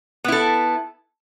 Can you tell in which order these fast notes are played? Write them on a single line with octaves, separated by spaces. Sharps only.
B3 E4 A4